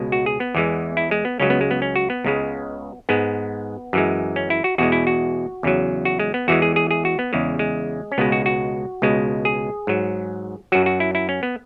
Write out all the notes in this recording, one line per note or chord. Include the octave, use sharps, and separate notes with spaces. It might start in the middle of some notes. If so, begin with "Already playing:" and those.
Already playing: C#2 B2 G#3
F#4
G#4
B3
E2 E3 G#3
E4
G#3
B3
C#2 C#3 F#3 C#4
B3
G#3
B3
C#4
F#4
B3
C#2 C#3 G#3
G#2 G#3 B3
F#2 E3 G#3
C#4
E4
F#4
E2 B2 G#3 F#4
E4
F#4
E2 C#3 F#3
F#4
G#3
B3
E2 E3 G#3 F#4
G#4
G#4
G#4
F#4
B3
E2 C#3 G#3
G#3
C#4
C#2 B2 G#3 B3
F#4
F#4
C#2 B2 G#3
G#4
G#2 F#3
F#2 F#3 F#4
F#4
E4
E4
C#4
B3